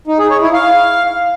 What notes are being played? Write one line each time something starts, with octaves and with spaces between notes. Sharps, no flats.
D#4
G#4
C#5
E4
F5